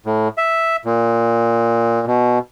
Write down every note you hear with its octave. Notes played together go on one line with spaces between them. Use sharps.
A2
E5
A#2
B2